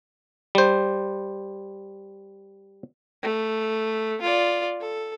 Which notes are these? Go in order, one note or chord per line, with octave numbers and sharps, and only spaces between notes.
G3 C5
A3
F4 D5
A4